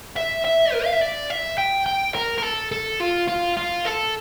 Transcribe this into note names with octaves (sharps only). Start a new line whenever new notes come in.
E5
E5
A#4
F5
E5
D5
E5
G5
G5
A#4
A#4
A4
A4
F4
F4
F4
A4